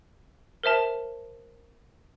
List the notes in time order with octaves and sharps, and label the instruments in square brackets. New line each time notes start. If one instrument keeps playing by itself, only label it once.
[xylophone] A#4 C5 E5 A5